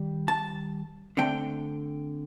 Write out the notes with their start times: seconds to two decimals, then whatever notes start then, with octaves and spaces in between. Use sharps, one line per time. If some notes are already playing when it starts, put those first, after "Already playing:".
Already playing: D#3 G3
0.28 A5
1.17 D3 A3 C4 G5